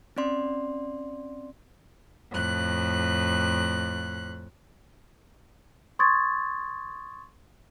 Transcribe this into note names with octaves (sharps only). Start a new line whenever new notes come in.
C4 C#4 D5 C6
F2 A2 F#6
C6 C#6 D#6 G#6 A6